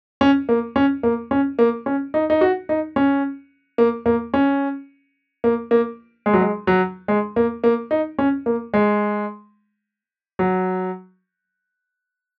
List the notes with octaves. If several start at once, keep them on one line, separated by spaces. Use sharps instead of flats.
C#4
A#3
C#4
A#3
C#4
A#3
C#4
D#4
D#4
F#4
D#4
C#4
A#3
A#3
C#4
A#3
A#3
G#3
F#3
G#3
F#3
G#3
A#3
A#3
D#4
C#4
A#3
G#3
F#3